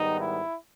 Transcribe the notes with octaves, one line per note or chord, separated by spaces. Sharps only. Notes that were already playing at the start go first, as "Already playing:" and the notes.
Already playing: G#2 D#3 G3 B3 D#4
E4